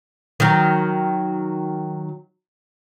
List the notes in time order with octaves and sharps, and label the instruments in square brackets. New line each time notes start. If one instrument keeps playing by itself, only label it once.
[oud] D#3 F#3